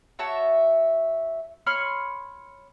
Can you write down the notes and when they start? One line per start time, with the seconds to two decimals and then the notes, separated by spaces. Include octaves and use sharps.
0.19 F#4 C#5 E5 A5
1.66 C#5 B5 C6 F6